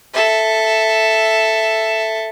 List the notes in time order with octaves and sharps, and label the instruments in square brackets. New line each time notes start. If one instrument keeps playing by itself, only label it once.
[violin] A4 E5